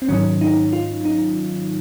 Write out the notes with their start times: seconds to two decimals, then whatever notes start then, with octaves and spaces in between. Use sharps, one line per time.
0.02 C4
0.09 G#2 D#3 F#3 C#4
0.41 D#4
0.73 F4
1.05 D#4